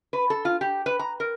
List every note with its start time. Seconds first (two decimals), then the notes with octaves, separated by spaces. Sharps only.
0.13 B4
0.30 A4
0.45 F4
0.61 G4
0.86 B4
0.99 A#5
1.20 A#4